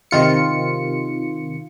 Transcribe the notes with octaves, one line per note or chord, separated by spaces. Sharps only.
C3 D#3 F4 C#7